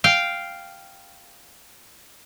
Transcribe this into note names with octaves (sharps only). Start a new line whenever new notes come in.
F5 G5